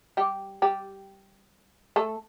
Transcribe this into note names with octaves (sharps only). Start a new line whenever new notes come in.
G3 G4
G3 G4
A3 A4